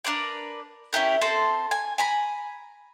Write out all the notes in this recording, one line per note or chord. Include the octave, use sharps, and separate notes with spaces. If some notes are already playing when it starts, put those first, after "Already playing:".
D4 A#4 B4 D5
C#4 E4 G4 A#4
C4 A4 C5 A5
G#5
G#5 A#5 B5